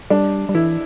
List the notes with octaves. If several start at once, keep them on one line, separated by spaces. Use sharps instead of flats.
G3 D4
G3
E3 E4